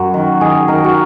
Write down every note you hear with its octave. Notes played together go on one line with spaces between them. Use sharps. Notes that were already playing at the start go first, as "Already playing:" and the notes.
Already playing: F#2 F#4
D#3
D#3 G#4
D#3 A#4
F#4